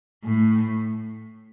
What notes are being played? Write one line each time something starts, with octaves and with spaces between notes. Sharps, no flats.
A2